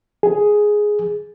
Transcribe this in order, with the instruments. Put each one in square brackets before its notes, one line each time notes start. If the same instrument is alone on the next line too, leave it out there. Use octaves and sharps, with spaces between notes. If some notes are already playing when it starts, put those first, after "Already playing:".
[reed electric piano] G#4